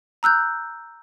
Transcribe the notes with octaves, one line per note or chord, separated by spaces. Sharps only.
A#5 E6 F#6 G6